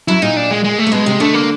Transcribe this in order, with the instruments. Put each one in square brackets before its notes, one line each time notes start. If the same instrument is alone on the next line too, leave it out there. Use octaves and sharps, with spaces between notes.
[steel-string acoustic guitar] F#2 F#3 [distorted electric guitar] E4
[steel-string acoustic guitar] A#2 A#3 [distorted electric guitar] D#4
[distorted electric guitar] D4
G#3
G#3
A3
[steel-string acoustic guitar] A#3
[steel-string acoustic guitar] B2 B3 [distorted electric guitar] G#3
[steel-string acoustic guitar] C3 C4
[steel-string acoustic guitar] D3 D4 [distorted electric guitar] A3
[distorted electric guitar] A#3